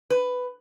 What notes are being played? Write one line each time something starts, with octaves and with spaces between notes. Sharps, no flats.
B4